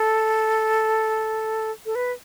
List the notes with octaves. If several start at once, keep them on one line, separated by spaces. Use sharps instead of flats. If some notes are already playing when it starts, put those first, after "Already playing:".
Already playing: A4
A4
B4